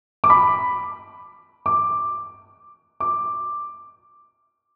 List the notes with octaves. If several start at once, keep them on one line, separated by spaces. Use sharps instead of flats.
D6
B5
D6
D6